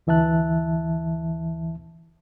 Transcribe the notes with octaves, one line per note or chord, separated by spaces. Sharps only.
D2 E3 E5 A5 F#6